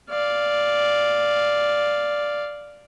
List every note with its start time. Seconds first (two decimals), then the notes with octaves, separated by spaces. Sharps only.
0.10 D5 F5